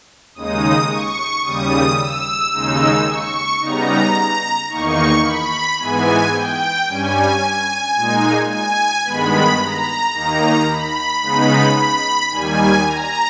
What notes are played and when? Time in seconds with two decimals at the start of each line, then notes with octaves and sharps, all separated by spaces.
0.35 D#2 C#3 G#3 D#4 D#6
0.89 C#6
1.43 D#2 C#3 G3 D#6
1.98 E6
2.52 D#2 C#3 G#3 D#4 E6
3.07 C#6
3.61 C#3 G3 B3 D#4 A#5
4.69 E2 D#3 A#3 D#4 C#6
5.24 B5
5.79 G#2 E3 G#3 B3 G#5
6.33 G5
6.88 G2 G3 C#4 G#5
7.96 A#2 G#3 D#4
8.50 G#5
9.05 G2 D#3 G#3 B3 B5
9.59 A#5
10.13 D#2 D#3 A#3 D#4 A#5
10.68 B5
11.22 C#3 G#3 B3 D#4 B5
11.76 B5
12.31 D#2 D#3 G3 G#5
12.85 A#5